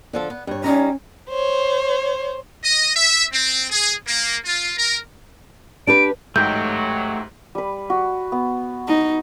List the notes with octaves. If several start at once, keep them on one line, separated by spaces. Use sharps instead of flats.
D3 F3 A4
B3
G2 C#5
G3 C#4 D#4 A#5
C5 C#5
D#5
E5
C4
G#4
A#3
F4
A#4
D4 G4 B4 D7
A1 G#2 F#3 A3 G4 D#5 G5 G6
G3 B4
F#4
B3
D#4